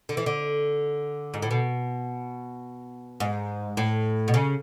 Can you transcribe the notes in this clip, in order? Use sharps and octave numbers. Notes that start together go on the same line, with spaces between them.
D3
E3
D3
G#2
A2
B2
G#2
A2
B2
C#3